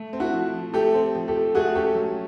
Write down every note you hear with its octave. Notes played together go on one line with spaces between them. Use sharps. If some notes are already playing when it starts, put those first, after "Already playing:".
Already playing: A3
C4
E4 F#4
F3
F3
A3 G4 A4
C4
F3
G4 A4
F3
A3 F#4 G#4
C#4 G4 A4
F#3